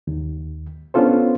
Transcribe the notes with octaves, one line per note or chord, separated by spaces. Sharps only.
D#2
B3 C#4 D4 F4 A4 C5